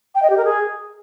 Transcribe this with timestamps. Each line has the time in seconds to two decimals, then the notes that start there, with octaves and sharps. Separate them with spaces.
0.15 G5
0.22 D#5
0.30 G4
0.37 A#4
0.45 G#4